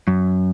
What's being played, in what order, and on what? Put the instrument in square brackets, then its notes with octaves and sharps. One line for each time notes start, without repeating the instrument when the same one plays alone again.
[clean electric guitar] F#2